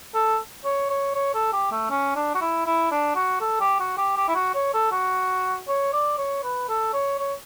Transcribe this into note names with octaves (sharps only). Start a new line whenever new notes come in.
A4
C#5
C#5
C#5
A4
G4
A3
C#4
D4
F#4
E4
E4
D4
F#4
A4
G4
F#4
G4
G4
E4
F#4
C#5
A4
F#4
C#5
D5
C#5
B4
A4
C#5
C#5